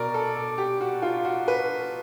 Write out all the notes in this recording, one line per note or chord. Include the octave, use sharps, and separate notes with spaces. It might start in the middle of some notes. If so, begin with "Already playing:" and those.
Already playing: B2 A#4 D5
A4
A4
G4
F#4
F4
F#4
B4